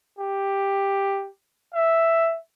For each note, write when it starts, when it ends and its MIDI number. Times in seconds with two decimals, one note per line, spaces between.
0.19 1.28 67
1.74 2.37 76